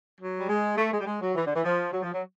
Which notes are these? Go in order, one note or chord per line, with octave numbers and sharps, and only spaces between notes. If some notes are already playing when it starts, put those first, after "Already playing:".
F#3
G3
G#3
A3
G#3
G3
G#3
F#3
E3
D3
E3
F3
F#3
F3
F#3